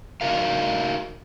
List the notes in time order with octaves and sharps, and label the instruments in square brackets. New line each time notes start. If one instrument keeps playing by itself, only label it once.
[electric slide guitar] D#4 F#4 A#4 F5